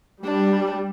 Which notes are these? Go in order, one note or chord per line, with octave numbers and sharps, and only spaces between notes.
G3 D4